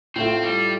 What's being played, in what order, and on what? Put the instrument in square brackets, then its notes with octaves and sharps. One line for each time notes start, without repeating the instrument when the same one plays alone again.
[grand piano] A2 A3 F4 [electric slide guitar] C4
[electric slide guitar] G3